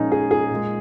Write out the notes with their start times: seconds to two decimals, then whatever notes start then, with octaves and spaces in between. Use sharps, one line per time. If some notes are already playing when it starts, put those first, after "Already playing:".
Already playing: A#2 F3 G#3 C#4 D#4
0.12 G#4
0.31 G#4
0.51 A#2 G#3